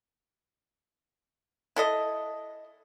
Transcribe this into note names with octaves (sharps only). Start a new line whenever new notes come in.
E4 A4 D#5